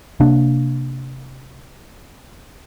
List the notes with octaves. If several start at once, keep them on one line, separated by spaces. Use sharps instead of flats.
C3 A#3 D4